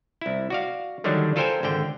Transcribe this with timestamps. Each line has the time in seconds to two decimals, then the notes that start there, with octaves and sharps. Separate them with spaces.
0.21 C2 E4
0.50 F#4 D5 F5
1.04 D3 D#3 F#3 G3 D4
1.36 F4 A4 A#4 C5 G5 G#5
1.63 G#1 D3 G5